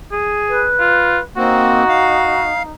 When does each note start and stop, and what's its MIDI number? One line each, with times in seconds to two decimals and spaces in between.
0.12 0.66 68
0.49 1.20 71
0.79 1.18 65
1.37 1.84 58
1.37 1.84 60
1.37 2.71 63
1.37 2.47 66
1.89 2.63 77